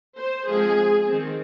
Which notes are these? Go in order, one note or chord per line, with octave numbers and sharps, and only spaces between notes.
C5
F3 G#3 C4 G#4
D#3 C4